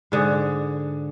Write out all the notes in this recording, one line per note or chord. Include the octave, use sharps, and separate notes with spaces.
G#2 D3 G#4